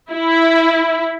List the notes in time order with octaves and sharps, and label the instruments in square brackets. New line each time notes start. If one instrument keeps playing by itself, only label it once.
[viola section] E4